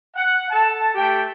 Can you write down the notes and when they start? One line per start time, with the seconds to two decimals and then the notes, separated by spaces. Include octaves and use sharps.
0.16 F#5
0.50 A4 A5
0.95 A3 G4 G5